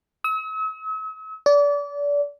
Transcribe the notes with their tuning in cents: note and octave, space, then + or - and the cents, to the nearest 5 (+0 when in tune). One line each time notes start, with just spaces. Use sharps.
E6 -45
D5 -30